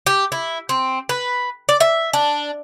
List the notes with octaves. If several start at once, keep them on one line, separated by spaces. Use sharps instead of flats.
G4
E4
C4
B4
D5
E5
D4